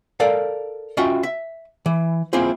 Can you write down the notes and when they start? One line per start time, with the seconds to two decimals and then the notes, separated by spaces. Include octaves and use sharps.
0.20 A4 A#4 D5 F5
0.97 C#4 F4 F#4 D#5 E5 G5
1.23 E5
1.86 E3
2.33 A#3 C4 E4 F4 G#4 C5